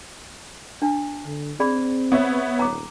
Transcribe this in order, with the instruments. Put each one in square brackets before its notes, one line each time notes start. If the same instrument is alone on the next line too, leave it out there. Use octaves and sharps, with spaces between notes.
[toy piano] D4 A5
[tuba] D3
[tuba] C4 [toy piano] G#4 D5 B5
[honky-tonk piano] B3 C#5 E5
[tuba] D#1 [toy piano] A#5 D6